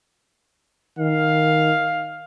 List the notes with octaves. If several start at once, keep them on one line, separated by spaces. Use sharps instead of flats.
D#3 F5